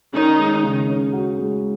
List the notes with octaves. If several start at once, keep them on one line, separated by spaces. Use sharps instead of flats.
D#3 C#4 D#4
G#3
C#3
C#4
F#4
G#3